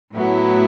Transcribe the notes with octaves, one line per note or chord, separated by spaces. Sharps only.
A2 F#3 B3 E4